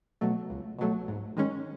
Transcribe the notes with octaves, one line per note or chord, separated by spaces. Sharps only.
B2 F#3 A3
C#2
B2 F#3 A3
G#2
D#3 G#3 C#4